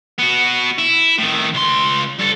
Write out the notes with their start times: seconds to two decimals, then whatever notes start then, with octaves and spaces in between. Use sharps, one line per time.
0.19 B3 F#4
0.79 E4
1.19 A2 D#3
1.55 C#2 C6
2.19 G2 A4